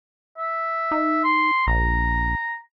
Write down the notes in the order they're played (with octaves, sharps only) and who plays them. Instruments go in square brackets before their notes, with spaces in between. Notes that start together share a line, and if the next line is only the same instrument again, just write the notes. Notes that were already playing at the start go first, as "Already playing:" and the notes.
[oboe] E5
[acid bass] D#4
[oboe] C6
[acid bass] A#1 [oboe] A#5